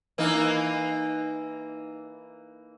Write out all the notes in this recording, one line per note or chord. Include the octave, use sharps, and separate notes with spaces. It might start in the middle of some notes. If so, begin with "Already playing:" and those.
E3 A#3 D#4